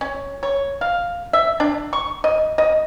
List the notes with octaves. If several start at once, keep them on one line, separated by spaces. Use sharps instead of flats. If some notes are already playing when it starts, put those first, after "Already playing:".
C#4
C#5
F5
E5
D4
C#6
D#5
D#5